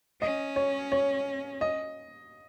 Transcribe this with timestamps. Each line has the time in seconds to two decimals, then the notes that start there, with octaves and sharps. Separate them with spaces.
0.22 C#4 D#5
0.56 C#5
0.92 C#5
1.61 D#5